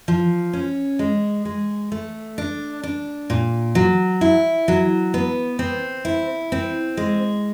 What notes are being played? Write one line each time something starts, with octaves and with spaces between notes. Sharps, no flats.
F3
C#4
G#3
G#3
A3
D4
D4
A#2
F#3
E4
F#3
B3
C4
E4
C4
G#3